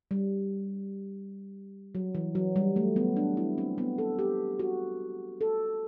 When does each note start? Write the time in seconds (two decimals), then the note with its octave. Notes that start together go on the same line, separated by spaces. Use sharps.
0.11 G3
1.95 F#3
2.15 E3
2.35 F#3
2.56 G3
2.76 A3
2.96 B3
3.17 D4
3.37 E4
3.58 C4
3.78 B3
3.98 A4
4.19 G4
4.59 F#4
5.41 A4